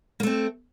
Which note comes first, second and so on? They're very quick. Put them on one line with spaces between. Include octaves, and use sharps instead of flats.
A#3 A3 C4